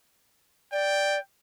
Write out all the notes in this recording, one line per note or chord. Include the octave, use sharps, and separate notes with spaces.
D5 G5